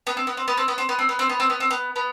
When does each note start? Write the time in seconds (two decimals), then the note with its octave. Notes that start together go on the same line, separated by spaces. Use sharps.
0.07 B3
0.17 C4
0.27 B3
0.37 C4
0.48 B3
0.57 C4
0.68 B3
0.78 C4
0.89 B3
0.99 C4
1.09 B3
1.19 C4
1.30 B3
1.40 C4
1.50 B3
1.60 C4
1.71 B3
1.96 B3